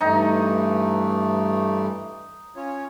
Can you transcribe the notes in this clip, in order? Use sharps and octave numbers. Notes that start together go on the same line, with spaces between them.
G2 E3 A3 D#4 A#5
C#4 F4 C#5